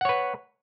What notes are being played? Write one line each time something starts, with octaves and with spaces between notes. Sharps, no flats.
B4 C#5 F#5